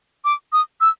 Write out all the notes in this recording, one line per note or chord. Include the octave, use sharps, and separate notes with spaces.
D6
D#6
E6